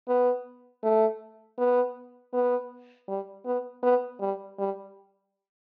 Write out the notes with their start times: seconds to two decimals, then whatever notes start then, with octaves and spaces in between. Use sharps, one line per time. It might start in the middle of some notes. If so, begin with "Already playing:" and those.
0.08 B3
0.83 A3
1.58 B3
2.33 B3
3.08 G3
3.46 B3
3.83 B3
4.20 G3
4.59 G3